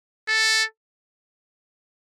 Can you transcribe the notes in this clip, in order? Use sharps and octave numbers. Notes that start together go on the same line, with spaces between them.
A4